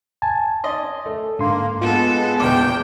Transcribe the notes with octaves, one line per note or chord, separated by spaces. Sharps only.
G#5 A5
D5 D#5 C6
A3
G#2 D3 A#3 C6
G#3 B3 F4 A4
A#1 E2 B2 G5 D6